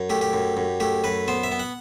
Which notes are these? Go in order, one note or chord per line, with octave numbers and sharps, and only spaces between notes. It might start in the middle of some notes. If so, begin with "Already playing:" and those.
Already playing: F#2
A3 G4
G4
F#2
F#2
A3 G4
F#2 B4
B3 C5
E5
B3
F#5